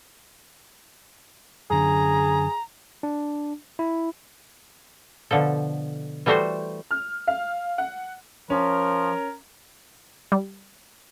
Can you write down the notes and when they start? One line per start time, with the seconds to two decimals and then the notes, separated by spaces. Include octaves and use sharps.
1.70 F#2 D3 G#4 A#5
3.03 D4
3.79 E4
5.31 B2 D3 F3 A4
6.26 E3 G3 A3 F#4 C5
6.91 F6
7.27 F5
7.78 F#5
8.50 F3 C#4 A#4
10.32 G3